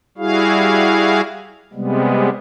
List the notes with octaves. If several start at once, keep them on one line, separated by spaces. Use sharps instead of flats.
G3 E4 F#4 G#4 F5
C3 G3 G#3 B3